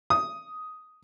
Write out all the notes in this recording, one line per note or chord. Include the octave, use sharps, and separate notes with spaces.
D#6